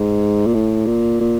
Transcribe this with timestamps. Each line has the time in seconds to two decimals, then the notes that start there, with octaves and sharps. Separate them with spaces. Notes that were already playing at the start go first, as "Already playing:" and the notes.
Already playing: G#2
0.47 A#2
0.54 A2
0.86 A#2
1.21 A#2